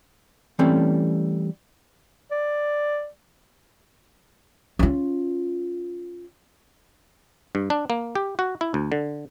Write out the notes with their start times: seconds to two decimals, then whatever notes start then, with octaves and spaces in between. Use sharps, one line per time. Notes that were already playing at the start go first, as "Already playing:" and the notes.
0.59 E3 G3 A3 C4 C#4
2.31 D5
4.79 C#4 F4
7.55 G2
7.70 D4
7.90 A#3
8.15 G4
8.39 F#4
8.61 E4
8.74 D2
8.92 D3